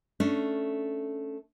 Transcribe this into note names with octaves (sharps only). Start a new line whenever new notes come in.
A3 C#4 D4